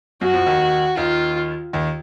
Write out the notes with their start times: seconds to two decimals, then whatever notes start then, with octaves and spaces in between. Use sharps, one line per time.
0.21 F#2 F#3 F#4
0.34 F2 F3
0.46 D#2 D#3
0.97 D#2 D#3 F4
1.73 D#2 D#3